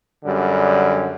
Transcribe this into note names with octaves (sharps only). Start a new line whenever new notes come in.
F#2 D3 G3